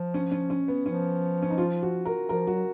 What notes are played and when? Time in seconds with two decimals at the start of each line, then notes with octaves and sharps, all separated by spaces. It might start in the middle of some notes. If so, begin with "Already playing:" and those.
Already playing: F3
0.14 C#4
0.31 C#4
0.50 C#4
0.68 B3
0.86 F3 C#4
1.42 C#4
1.50 D#4
1.58 F4
1.82 F#4
2.05 A#4
2.29 F3 A#4
2.47 F#3 F#4